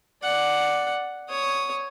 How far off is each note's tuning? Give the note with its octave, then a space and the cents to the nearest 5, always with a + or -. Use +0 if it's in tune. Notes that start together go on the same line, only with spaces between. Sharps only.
D5 +0 F#5 +0
C#5 +0 D#6 +0